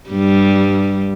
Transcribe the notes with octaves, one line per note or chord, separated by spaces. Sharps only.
G2 G3